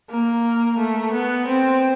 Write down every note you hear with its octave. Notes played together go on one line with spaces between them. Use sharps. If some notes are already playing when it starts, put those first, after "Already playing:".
A#3
A3
B3
C4